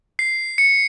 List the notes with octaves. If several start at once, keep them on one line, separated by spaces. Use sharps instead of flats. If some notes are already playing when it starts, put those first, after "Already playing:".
C7
C#7